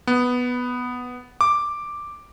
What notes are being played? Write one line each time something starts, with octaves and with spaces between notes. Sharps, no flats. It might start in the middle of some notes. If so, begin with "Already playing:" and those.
B3
D6